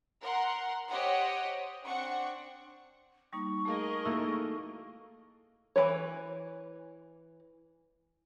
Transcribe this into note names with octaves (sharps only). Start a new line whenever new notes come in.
A#4 F#5 C6
G4 C5 C#5 D#5 F#5
C4 D4 F#5 C#6
G3 A#3 D#4 C#6
A3 G#4 A#4 D#5 F5
A3 A#3 D#4 E4 F#4
E3 A#3 B4 C#5